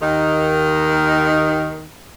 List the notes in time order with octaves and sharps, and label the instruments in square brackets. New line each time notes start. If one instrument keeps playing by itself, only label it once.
[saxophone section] D#2 D#3